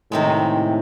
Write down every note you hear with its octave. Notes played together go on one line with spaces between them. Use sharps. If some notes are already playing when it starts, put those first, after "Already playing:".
A2 C3 D#3 G#3